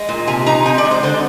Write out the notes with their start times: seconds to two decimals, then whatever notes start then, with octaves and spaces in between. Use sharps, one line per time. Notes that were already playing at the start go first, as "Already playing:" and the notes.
Already playing: G#3
0.09 A#2
0.27 C3 G#5
0.46 D#4 A#5
0.66 C4 G#5
0.78 D5
0.85 G#3
0.91 C5
1.03 D3 C5